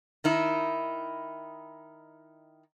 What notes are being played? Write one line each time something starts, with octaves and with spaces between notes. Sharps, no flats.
D#3 D#4 E4